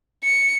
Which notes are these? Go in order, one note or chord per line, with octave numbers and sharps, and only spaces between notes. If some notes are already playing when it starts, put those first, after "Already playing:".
C#7